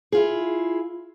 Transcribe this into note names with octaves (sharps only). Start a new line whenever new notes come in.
E4 F4 G#4